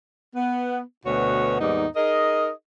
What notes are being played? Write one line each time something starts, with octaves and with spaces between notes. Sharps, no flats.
B3
D2 B2 F#4 B4 C#5
D#2 G#2 G3 B3 D#4
D#4 G#4 A#4 D#5